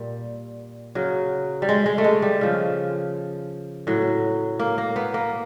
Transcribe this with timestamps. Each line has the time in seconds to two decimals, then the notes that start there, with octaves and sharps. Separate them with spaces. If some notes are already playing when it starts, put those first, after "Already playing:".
Already playing: A#2 G3
0.95 C#3 F#3
1.62 G3
1.69 G#3
1.86 G#3
1.98 A3
2.04 G#3
2.22 G3
2.41 C#3 F3
3.87 A2 F#3
4.59 A#3
4.78 A#3
4.96 B3
5.14 A#3